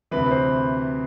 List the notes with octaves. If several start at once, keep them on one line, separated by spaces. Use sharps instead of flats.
D2 C3 E3 B4
C5